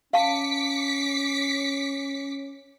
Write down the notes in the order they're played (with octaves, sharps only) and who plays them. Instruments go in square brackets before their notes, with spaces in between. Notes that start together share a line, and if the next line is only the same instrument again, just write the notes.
[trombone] C#4 [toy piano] F5 A5 [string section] D6 B6 C#7